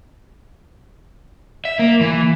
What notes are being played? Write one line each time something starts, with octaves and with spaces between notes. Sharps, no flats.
E5
A#3
E3